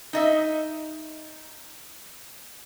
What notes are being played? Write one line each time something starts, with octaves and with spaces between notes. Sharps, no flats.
D#4 D#5 E5